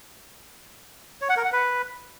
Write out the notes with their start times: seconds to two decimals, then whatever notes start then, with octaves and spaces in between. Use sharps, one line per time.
1.21 C#5
1.29 F#5
1.37 A#4
1.45 F#5
1.52 B4